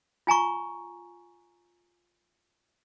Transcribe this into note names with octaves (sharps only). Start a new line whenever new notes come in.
F4 G#5 A#5 C#6